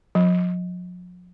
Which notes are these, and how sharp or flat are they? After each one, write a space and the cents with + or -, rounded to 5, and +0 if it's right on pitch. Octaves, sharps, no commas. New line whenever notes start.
F3 +45